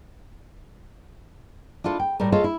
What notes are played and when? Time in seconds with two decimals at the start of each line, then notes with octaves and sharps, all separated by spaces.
1.84 D4 E4 F4 A4
2.00 G5
2.20 A2 G3 A4 A#4
2.32 F4 G#4 A4 C#5 D#5 F5
2.44 E4